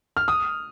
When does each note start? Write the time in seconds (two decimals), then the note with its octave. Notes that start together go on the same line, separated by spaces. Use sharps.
0.17 F6
0.28 D#6